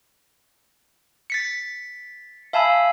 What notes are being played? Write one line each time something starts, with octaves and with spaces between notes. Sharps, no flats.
A6 B6 C#7
E5 F5 G#5 A5 B5 E6